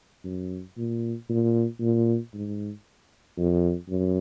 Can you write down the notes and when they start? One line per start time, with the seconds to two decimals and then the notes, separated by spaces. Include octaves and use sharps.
0.24 F#2
0.77 A#2
1.29 A#2
1.80 A#2
2.34 G#2
3.37 F2
3.88 F#2